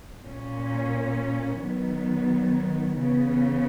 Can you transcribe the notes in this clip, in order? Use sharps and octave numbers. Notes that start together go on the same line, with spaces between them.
A#2 A#3 C#4
D#3 F#3 B3
C#3 E3 B3